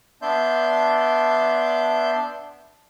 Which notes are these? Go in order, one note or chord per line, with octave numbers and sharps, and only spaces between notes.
B3 D4 D5 E5 C6 G6